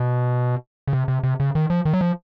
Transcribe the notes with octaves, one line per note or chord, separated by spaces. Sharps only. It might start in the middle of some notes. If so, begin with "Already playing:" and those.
Already playing: B2
C#3
C3
C3
C3
C#3
D#3
F3
D#3
F#3
F3